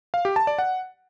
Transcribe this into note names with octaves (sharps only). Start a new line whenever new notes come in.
F5
G4
A5
D5
F#5